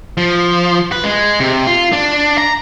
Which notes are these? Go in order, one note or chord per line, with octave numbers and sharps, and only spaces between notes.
F3
B4
G#3
C3
F4
D4
A#5